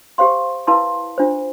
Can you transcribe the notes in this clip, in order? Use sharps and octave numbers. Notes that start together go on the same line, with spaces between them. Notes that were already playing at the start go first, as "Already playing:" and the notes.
G4 C5 F5 C6
E4 B4 F5 A5 C6
D4 F4 C5